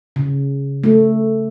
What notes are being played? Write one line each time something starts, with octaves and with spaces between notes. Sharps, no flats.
C#3
A3